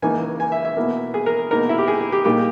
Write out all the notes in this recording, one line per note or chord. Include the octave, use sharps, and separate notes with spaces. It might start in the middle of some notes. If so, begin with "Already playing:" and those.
C#2 C#3 E3 A#3 D#4 G#5
G#5
E5
E5
B2 A#3 E4
G#4
A#4
B2 A#3 D#4 A#4
E4
G4
G#4
G4
A#2 G3 A#3 D#4 G4